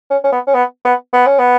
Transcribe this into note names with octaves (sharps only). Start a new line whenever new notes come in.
C#4
C#4
B3
C#4
B3
B3
B3
C#4
B3